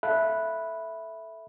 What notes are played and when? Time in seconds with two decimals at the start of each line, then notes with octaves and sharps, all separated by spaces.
0.03 A4 E5 F5 A5 B5 F#6